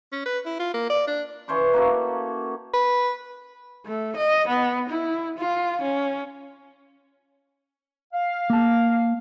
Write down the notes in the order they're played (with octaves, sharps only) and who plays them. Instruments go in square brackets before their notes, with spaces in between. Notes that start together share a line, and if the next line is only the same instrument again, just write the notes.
[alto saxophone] C#4
B4
E4
F4
A#3
D5
D4
[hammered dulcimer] E3 C#4 C5 D6
A#3 C#4 F#4 A4
[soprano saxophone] B4
[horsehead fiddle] A3
D#5
B3
E4
F4
C#4
[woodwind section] F5
[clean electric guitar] A#3 A5